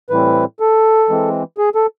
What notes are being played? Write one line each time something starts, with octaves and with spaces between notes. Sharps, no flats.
A2 E3 G3 C4 E4 B4
A4
E3 G#3 C4
G#4
A4